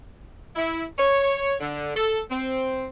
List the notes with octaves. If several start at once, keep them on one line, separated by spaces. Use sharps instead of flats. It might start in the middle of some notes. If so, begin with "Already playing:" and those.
E4
C#5
D3
A4
C4